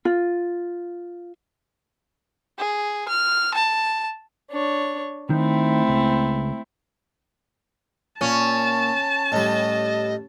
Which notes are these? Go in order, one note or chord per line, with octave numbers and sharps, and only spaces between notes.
F4
G#4
F6
A5
D4 C#5
D#3 A3 C4 E4
C#2
A#2 C#4 A5
A2 G3 D#5